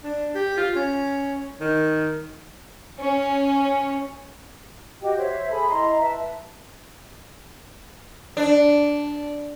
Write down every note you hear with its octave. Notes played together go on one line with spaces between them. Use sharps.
D4
G4
F4
C#4
D#3
C#4
F#4 G4 D#5 G5
C5 C#5 E5
G#4 A4 G#5 B5
E4 D#5 A#5 C6
B4 E5 A5
D4